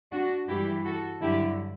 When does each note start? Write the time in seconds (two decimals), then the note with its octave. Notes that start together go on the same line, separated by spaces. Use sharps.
0.12 D4 F#4
0.49 G2 E3 G3 E4 G4
0.85 F#4 A4
1.21 G2 D3 F#3 E4 G4